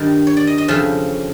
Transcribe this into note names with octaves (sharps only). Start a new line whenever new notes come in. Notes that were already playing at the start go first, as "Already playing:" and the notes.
Already playing: G2 D#3 D5
C#5
D5
D#5
D#5
F2 C#3 F3 E5